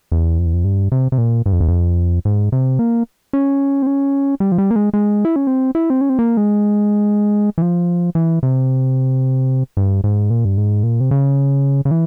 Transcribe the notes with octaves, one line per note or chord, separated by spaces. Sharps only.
E2
F2
E2
F2
G2
C3
C3
A#2
G2
F2
E2
F2
G#2
C3
A#3
C#4
C4
C#4
G3
F3
G3
A#3
G#3
G#3
E4
C#4
C4
E4
C4
C#4
C4
A#3
G#3
E3
F3
E3
C3
G2
G#2
A#2
G2
G#2
A#2
C3
C#3
C#3
E3